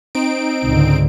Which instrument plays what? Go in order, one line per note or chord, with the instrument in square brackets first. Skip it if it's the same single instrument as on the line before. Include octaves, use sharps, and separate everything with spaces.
[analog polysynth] C4 D#4 D7
[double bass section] C#2 G#2 D3